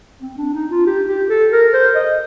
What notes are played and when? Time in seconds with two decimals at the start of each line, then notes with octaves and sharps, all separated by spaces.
0.22 C4
0.38 D4
0.54 D#4
0.71 F4
0.87 G4
1.09 G4
1.30 A4
1.52 A#4
1.74 C5
1.95 D#5